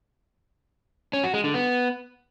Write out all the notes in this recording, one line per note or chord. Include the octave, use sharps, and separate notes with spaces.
C#4
F#4
G#3
D3
B3